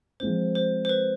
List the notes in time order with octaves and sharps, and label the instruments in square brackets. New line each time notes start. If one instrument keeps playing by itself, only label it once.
[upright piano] F3 G#3 C4 [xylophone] C5
[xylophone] C5
C5
B4